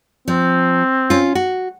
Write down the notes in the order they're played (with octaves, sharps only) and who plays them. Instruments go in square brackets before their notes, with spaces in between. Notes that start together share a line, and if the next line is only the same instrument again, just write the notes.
[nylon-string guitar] F3 [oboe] C4
[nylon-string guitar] C#4 F4
F#4